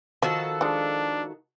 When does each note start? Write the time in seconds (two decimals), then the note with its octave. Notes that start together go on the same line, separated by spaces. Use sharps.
0.22 D#3 F3 F#4 A4
0.61 F3 G#3 D4